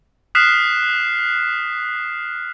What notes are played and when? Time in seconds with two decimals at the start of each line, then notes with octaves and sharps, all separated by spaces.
0.35 D#6 F6 F#6 B6 C7 E7